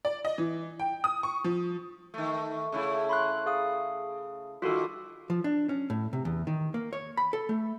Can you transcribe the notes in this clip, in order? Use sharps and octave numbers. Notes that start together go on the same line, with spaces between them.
D5
D#5
E3
G5
D#6
C#6
F3
D#3 A3
C#3 A3 E4
B5 C6 F#6
G#4 F5 D#6
D#3 G3 F4 F#4 A4
F3
D4
C#4
A2
C3
E2
D#3
A#3
C#5
B5
A4
A3